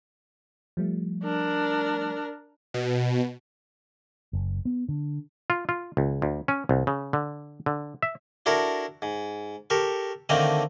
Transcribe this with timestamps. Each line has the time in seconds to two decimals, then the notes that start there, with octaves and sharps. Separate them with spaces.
0.77 F3 G3 A3
1.24 D4 A#4
2.74 B2
4.33 F#1
4.65 B3
4.89 D3
5.50 F4
5.69 F4
5.97 C#2
6.22 D2
6.48 C#4
6.69 C2
6.87 C#3
7.13 D3
7.66 D3
8.03 E5
8.46 D4 E4 F#4 A4 A#4
9.02 G#2
9.70 G4 A4 A#4 C#6
10.29 D3 D#3 A3 A#3 C4 D#4